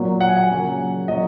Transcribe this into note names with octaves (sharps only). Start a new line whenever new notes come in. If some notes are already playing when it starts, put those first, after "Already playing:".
Already playing: A#2 F#3 A#3
F#5
G#5
F#5
C#3 F#3 A#3
A#2 F#3 A#3 D#5